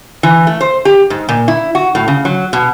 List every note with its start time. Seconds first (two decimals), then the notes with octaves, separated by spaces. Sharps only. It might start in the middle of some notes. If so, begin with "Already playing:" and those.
0.23 E3
0.47 A3
0.61 C5
0.85 G4
1.10 G#2
1.29 A#2
1.48 E4
1.75 F#4
1.95 A2
2.08 C#3
2.25 F#3
2.53 B2